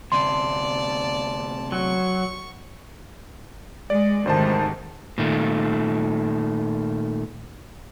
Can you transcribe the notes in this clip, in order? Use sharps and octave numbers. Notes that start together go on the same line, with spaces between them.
D2 C3 D5 A5 C6
F#3 C#6
G#3 D5
D2 G#2 C3 D#3 C5 A5
A#2 D#3 A3